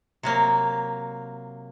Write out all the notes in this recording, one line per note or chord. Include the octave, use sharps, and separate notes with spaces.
C3 F#3 A#3